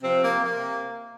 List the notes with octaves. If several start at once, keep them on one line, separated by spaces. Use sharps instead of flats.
C3 F3 C4
A#3
C3 A#3